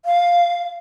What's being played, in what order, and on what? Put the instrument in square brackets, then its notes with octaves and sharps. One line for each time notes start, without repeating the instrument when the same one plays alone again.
[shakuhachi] F5